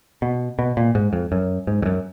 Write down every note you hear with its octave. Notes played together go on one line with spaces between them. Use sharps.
B2
B2
A#2
G#2
F2
F#2
G#2
F2
F#2